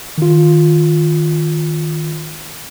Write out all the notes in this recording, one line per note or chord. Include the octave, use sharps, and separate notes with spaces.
D#3 F4